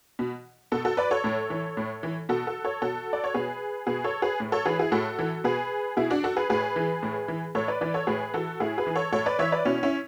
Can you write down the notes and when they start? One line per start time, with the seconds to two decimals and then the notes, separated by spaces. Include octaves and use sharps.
0.19 B2
0.72 B2 F#4 A4
0.85 F#4 A4
0.97 B4 D5
1.11 A4 C#5
1.24 A2
1.50 E3
1.77 A2
2.03 E3
2.29 B2 F#4 A4
2.47 F#4 A4
2.64 A4 C#5
2.82 B2 F#4 A4
3.13 D5
3.24 C#5
3.34 B2 G#4 B4
3.87 B2 G#4 B4
4.04 A4 C#5
4.22 G#4 B4
4.40 A2
4.52 A4 C#5
4.66 E3 G#4 B4
4.79 E4 G#4
4.92 A2 F#4 A4
5.19 E3
5.44 B2 G#4 B4
5.97 B2 E4 G#4
6.10 D4 F#4
6.24 F#4 A4
6.37 G#4 B4
6.50 A2 G#4 B4
6.76 E3
7.03 A2
7.28 E3
7.55 A2 A4 C#5
7.68 B4 D5
7.81 E3 B4 D5
7.94 A4 C#5
8.07 A2 G#4 B4
8.34 E3 F#4 A4
8.60 A2 E4 G#4
8.78 G#4 B4
8.87 E3
8.96 A4 C#5
9.13 A2 A4 C#5
9.26 B4 D5
9.39 E3 C#5 E5
9.52 B4 D5
9.65 B2 C#4 E4
9.83 C#4 E4